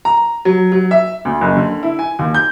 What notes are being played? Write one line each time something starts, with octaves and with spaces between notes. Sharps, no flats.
A#5
F#3
F#3
E5
D2
F#1
D3
E4
G#5
D#2
G6